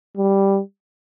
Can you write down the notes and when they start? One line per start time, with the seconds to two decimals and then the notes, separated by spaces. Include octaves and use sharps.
0.17 G3